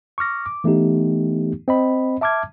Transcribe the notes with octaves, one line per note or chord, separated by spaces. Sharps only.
C#6 D6 F6 A#6
D6
E3 A3 B3 D#4 G4
C4 D#5 B5
E5 A5 D6 F6 G#6